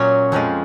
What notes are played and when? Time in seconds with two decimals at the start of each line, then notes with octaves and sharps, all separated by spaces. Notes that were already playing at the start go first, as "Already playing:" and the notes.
Already playing: A#2 F#3 C#4
0.32 F2 F3 G#3